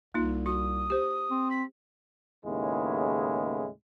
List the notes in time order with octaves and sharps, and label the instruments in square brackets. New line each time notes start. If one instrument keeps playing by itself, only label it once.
[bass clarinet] C2 [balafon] A#3 D#4 F4
[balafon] F#4 [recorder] D#6
[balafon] G4 C5
[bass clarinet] C4
[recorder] B6
[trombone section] D#2 A2 C#3 G#3 B3 E4